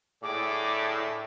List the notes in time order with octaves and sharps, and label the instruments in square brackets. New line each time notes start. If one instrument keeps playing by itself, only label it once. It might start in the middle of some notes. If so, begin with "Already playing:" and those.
[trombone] A2 [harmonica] G#4 A4 D5 [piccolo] D6